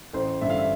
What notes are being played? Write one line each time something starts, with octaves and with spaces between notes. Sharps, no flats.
A1 C5
G2 D3 E5
F5
E5